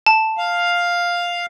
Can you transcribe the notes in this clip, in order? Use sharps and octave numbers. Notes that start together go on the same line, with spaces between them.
A5
F5